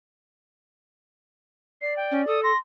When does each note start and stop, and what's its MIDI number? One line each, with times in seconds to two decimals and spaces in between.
1.82 2.40 74
1.82 1.96 96
1.97 2.22 79
2.11 2.26 61
2.27 2.52 69
2.27 2.43 87
2.43 2.57 84
2.43 2.57 94